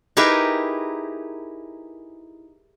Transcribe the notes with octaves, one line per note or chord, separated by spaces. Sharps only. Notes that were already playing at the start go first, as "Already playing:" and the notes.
D#4 E4 G4 G#4 A#4 B4